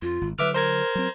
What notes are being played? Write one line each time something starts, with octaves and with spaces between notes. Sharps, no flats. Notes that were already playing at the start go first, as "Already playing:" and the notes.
F2 F4
G#1
D3 F#3 B4 E5 D6 F6
A#4 C5 A#5 G#6
F#3 C4